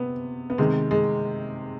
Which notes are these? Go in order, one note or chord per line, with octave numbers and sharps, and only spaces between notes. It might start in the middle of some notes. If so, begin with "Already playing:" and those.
Already playing: C3 B3
B3
C3 D#3 G#3
G#3